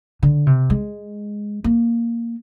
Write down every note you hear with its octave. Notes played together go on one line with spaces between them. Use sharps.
D3
C3
G#3
A#3